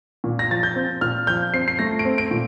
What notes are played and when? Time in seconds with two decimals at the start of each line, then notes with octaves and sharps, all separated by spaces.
0.24 A#2
0.39 A#6
0.50 F3 A6
0.63 G6
0.75 C4
1.01 A#2 F6
1.27 F3 G6
1.54 C4 C7
1.68 C7
1.79 A3 A#6
1.99 D7
2.05 C4
2.18 D7
2.31 A#2